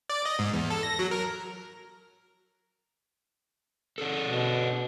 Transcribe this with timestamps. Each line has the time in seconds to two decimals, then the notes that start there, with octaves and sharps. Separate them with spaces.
0.10 D5
0.25 D#5
0.39 G#2
0.53 E2
0.70 A4
0.83 A#6
0.99 F#3
1.11 A#4
3.98 D4 G#4 A4
4.23 B2